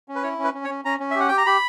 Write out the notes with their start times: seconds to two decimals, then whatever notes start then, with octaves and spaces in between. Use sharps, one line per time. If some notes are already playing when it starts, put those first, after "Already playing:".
0.08 C#4
0.15 B4
0.23 E4 C#5
0.39 C#4
0.44 B4
0.54 C#4
0.64 C#5
0.69 C#4
0.85 C#4 A#5
1.00 C#4
1.11 E5
1.15 G4 F#5
1.28 G4 G5
1.37 A#5
1.46 G4 B5